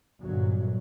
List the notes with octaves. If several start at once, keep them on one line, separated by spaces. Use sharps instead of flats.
G1 A#2 F#3